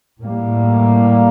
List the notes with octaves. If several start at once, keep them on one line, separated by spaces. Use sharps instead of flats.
A2 G3 A#3